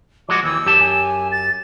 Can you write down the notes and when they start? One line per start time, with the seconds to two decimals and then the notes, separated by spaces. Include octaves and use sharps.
0.29 F3 G#3 F#4 D6
0.43 D#2 E3 E6
0.65 F#2 G4 A5
0.80 G#5
1.31 A6